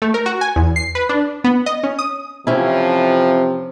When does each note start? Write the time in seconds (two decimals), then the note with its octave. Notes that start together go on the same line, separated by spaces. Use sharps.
0.02 A3
0.14 A#4
0.26 F#4
0.41 G#5
0.56 E2
0.76 C7
0.95 B4
1.09 D4
1.44 B3
1.66 D#5
1.83 C#4
1.99 D#6
2.47 F2 C3 E3 F3 C4 C#4 E4